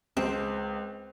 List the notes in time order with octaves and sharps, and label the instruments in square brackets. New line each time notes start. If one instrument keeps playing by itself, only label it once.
[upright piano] C#2 [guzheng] C4 [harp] C5